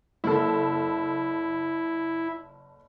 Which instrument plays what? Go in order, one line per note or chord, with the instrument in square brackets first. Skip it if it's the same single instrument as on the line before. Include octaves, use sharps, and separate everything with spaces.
[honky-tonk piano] F#1 A4 [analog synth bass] E4